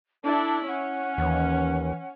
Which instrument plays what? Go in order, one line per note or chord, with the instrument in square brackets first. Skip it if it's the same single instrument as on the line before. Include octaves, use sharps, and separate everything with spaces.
[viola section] D4 E4 [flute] A4
[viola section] C#4 [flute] F#5
[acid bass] D#2 [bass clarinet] E3